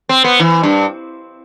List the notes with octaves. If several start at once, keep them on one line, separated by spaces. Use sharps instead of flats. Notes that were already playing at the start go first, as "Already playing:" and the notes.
C4
B3
E3
G2